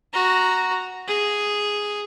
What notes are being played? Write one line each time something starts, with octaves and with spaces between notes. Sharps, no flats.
F#4 A#5
G#4